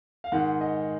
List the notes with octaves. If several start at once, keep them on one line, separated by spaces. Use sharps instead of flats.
F5
G#2 D#3 G#3 F#5
D#5